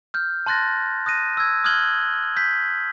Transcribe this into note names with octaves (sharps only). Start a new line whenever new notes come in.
F6 G6
A5 C6 F#6 A6 A#6
D#6 F#6 A#6 D#7
E6 G#6
D#6 F6 F#6 G#6 F#7 G7
G6 B6